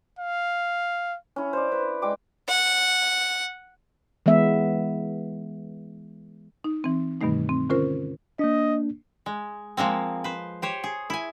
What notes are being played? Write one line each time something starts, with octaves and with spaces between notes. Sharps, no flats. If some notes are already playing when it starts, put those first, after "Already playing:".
F5
C#4 E4
C5 D5
B4
G#3 D5 G5 D6
F#5
E3 G#3 B3 E5
D#4
E3 C4
G2 B2 D#3 G3 A3 D#4
C4
D3 C#4 F4 A#4 C5
A#3 D4 D#5
G#3
F3 G#3 A#3 C4
B4 C5
G4 C5 C#5
G#4
E4 G#5